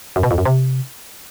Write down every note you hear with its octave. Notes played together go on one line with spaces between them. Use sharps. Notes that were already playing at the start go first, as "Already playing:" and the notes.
F#2
B2
F2
F#2
C3